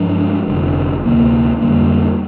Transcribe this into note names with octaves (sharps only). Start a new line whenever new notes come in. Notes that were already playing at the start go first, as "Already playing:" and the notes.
Already playing: G2 F3 G#3 D4
F1 F2 D3
D2 C3 D#3 A#3
F2 D3 G3 A#3